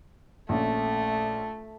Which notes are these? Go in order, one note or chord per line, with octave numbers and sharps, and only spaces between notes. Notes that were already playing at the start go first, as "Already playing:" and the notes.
A#1 A3 C#4